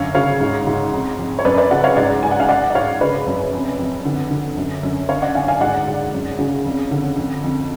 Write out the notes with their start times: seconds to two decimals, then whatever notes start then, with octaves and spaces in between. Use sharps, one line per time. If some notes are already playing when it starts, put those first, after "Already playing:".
Already playing: F#2 D3 C#5 F5
0.15 C#3 C#5 F5
0.40 G#2
0.67 G#2
0.92 F2
1.19 F2
1.39 C#5
1.45 F#2 B4 D5
1.58 B4 D5
1.71 C#3 D5 F#5
1.84 C#5 F5
1.97 G#2 D5 F#5
2.23 G#2 G#5
2.31 F#5
2.40 F5 G#5
2.49 G#2 D5 F#5
2.70 D5
2.75 G#2 C#5 F5
3.01 C#3 B4 D5
3.27 F#2
3.53 F2
3.79 F2
4.05 D3
4.31 D3
4.57 F#2
4.83 F#2
5.09 D3 C#5 F5
5.22 D5 F#5
5.35 D3 F5 G#5
5.48 F5 G#5
5.61 G#2 D5 F#5
5.87 G#2
6.14 F#2
6.39 C#3
6.65 F2
6.91 D3
7.17 F2
7.43 F2